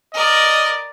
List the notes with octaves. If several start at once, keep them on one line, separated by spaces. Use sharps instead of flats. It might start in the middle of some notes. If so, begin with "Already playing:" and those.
A#4 D5 D#5